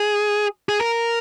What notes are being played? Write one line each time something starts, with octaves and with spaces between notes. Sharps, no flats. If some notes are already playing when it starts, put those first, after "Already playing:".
Already playing: G#4
G#4
A#4